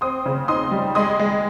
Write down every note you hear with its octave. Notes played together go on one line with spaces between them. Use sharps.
C4 C6 D#6
C#3
D#4 C6 D#6
G3
G#3 C6 D#6
G#3